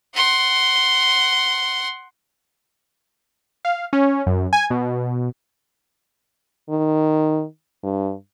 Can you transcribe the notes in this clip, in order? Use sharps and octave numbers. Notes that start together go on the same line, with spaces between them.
F#5 C6
F5
C#4
F#2
G#5
B2
D#3
G2